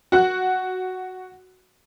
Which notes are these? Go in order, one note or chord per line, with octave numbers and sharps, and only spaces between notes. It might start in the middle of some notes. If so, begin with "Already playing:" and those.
F#4 F#5 F#6